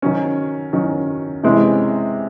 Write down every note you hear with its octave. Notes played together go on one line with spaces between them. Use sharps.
D#3 F#3 C#4
D#3 F#3 C#4
C3 E3 G#3 C#4